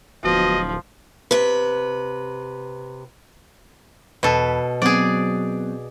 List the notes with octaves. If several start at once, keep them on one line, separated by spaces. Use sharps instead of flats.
D1 B2 F3 D#5
C3 B4
E2 B2 A4 B5
F#3 B3 C4 G#4 D5